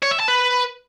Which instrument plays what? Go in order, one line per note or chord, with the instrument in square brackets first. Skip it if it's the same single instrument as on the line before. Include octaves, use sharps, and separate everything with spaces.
[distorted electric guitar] C#5
E5
A5
B4